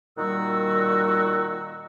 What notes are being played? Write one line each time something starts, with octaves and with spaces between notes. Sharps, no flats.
A#2 D#3 G3 F#4 E6